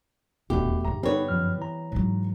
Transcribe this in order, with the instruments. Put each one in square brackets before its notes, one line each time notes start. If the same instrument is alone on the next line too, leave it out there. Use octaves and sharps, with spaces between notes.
[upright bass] D#1 D4 [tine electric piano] E2 A3 [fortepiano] B2 [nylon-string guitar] G4
[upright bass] G2 D3 [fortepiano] A#5
[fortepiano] G3 B3 [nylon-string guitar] C4 C#5 [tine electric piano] D#4 A4
[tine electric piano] F#2 F3 F6
E3 A#5
[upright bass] G#2 F#3